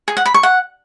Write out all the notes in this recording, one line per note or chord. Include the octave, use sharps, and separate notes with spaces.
G#4
F#5
B5
C#6
F#5